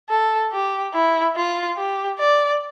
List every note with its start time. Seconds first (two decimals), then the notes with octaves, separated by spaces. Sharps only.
0.10 A4
0.52 G4
0.94 E4
1.36 F4
1.77 G4
2.19 D5